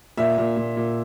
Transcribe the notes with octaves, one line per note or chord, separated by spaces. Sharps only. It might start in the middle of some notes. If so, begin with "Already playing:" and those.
A#2 E5
A#2
A#2
A#2